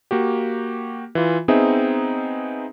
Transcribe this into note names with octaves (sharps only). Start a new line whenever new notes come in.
A#3 F#4 G4
E3 F4
B3 C4 D#4 G#4 E5